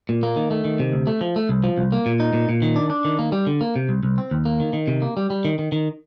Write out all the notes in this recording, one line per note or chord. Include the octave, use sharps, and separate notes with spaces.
A#2
A#3
D#3
A3
D#3
C3
D2
A3
F3
A3
C2
F3
C2
A#3
A#2
D#4
A#2
A#2
D#3
D4
D4
D#3
A#3
G3
D3
A#3
C3
C2
C2
C4
D#2
A#3
D#3
D#3
C3
A#3
G3
G3
D#3
D#3
D#3